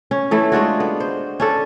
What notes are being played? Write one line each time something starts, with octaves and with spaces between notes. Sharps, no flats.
C#4
E3 A3 E4
G#3 D4 F4 F#4
B3
C5
C#4 D4 A4